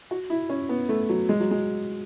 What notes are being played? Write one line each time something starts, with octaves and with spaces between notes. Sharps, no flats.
F#4
E4
C#4
B3
A3
F#3
G#3
F#3
G#3